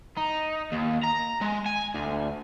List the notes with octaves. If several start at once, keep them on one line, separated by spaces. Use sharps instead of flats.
D#4
D#2
A#5
G#3
G#5
D2